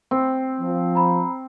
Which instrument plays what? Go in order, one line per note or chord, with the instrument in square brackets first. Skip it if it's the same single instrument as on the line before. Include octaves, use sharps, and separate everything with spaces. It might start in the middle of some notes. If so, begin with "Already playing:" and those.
[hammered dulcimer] C4
[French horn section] F3
[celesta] A#5 B5